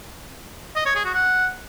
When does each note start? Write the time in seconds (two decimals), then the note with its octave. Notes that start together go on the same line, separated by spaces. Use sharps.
0.76 D#5
0.86 C#5
0.95 G#4
1.05 F#4
1.14 F#5